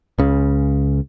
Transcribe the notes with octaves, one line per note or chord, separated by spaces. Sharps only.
C#2 C#3